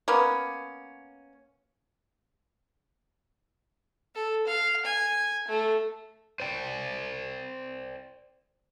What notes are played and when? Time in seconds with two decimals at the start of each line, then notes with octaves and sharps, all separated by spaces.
0.08 A#3 B3 C#4
4.15 A4
4.47 F5
4.85 G#5
5.48 A3
6.40 C5 D5 G5